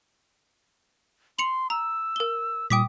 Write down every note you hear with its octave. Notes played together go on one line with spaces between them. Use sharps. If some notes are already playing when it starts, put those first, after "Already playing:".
C6 C#7 F7 F#7
A#5 E6
A#4 G7
A#2 G3 G5 D6 D#6 B6